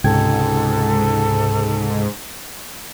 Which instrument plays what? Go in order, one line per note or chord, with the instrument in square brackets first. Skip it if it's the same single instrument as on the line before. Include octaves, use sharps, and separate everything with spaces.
[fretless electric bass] C#2 [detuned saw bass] G#2 [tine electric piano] C3 G5 G#6 [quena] A4